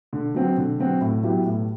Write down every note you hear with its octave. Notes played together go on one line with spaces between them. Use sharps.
D3
F#3 C4 F#4
D3
F#3 C4 F#4
A2
F#3 B3 E4 G4
A2